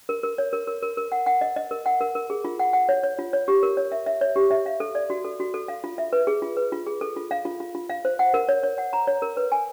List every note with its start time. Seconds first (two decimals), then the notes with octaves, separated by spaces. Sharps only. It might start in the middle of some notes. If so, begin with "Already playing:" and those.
0.09 A#4
0.23 A#4
0.38 C#5
0.53 A#4
0.67 A#4
0.83 A#4
0.97 A#4
1.12 F#5
1.26 F#5
1.41 D#5
1.56 D#5
1.71 A#4
1.86 F#5
2.01 A#4
2.15 A#4
2.30 G#4
2.45 F4
2.59 F#5
2.73 F#5
2.89 C#5
3.03 C#5
3.19 F4
3.33 C#5
3.48 G4
3.63 A#4
3.77 C#5
3.92 E5
4.06 E5
4.21 C#5
4.36 G4
4.51 E5
4.66 F5
4.80 A4
4.95 D5
5.10 F#4
5.24 A4
5.40 F#4
5.54 A4
5.68 F5
5.84 F4
5.98 E5
6.13 B4
6.27 G#4
6.42 F4
6.57 B4
6.72 F4
6.87 G#4
7.01 A4
7.16 F4
7.31 F5
7.45 F4
7.60 F4
7.75 F4
7.89 F5
8.05 C5
8.19 F#5
8.34 A#4
8.49 C#5
8.63 C#5
8.78 F#5
8.93 A#5
9.07 C#5
9.22 A#4
9.37 B4
9.52 G#5